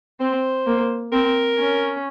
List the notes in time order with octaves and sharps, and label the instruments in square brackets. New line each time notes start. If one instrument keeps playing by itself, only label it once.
[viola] C4 [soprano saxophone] C5
[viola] A#3
[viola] C4 [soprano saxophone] A#4
[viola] C#4